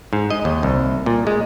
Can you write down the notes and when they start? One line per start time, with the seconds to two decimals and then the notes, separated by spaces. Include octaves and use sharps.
0.13 G#2
0.30 D#5
0.45 D#2
0.63 C2
1.06 A#2
1.27 G#3